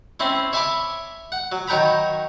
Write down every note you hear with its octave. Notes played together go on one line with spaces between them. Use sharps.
C4 C#4 E4
C#5 E5 G#5 A5 B5 D6
F#5
F#3
D#3 F#3 C#5 G5 A#5 B5